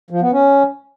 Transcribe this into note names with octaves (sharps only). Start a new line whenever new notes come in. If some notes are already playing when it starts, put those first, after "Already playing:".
F3
B3
C#4